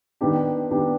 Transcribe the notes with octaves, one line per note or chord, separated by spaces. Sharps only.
D#3 B3 D4 G4
D#3 B3 D4 G4